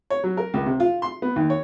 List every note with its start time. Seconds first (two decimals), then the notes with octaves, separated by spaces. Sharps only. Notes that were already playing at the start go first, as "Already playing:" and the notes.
0.10 C#5
0.24 F#3
0.37 A#4
0.54 C#2
0.66 C3
0.80 F4
1.02 C6
1.22 B3
1.36 D#2
1.50 C#5